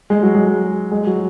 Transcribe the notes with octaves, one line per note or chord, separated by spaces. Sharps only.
G#3
F#3
G#3
G#3
F#3